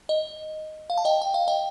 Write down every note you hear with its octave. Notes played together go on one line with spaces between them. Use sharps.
D#5
F5
A5
D#5 G5
G5
F5
D#5 G5